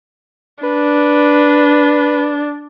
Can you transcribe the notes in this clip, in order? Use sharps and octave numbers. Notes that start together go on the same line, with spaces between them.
D4 B4